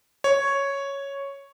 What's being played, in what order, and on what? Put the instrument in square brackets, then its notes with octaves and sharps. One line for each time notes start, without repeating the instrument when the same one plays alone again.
[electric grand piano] C#5